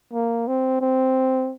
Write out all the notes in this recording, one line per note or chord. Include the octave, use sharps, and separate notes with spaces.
A#3
C4
C4